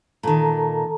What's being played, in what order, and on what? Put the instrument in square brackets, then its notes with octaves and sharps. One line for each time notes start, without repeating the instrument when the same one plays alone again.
[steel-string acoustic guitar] A#2 D#3 [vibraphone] A4 A5 A#5